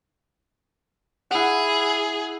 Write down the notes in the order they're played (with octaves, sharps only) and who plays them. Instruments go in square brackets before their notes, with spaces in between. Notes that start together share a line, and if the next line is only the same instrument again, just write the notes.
[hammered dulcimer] E4 F#5 [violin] G#4